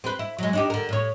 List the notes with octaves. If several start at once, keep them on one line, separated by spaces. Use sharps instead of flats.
C4 B4
E4
F#3 G#3
D4 D#4 G4
D3 A#4
A2 C#5